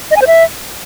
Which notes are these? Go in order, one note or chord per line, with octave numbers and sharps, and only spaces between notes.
D#5
G#5
C5
E5